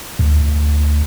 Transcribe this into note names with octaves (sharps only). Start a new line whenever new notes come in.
D2